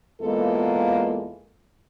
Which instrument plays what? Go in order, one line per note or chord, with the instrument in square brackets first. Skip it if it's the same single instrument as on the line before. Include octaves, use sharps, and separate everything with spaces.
[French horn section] E2 G#3 A#3 B3 F4 A4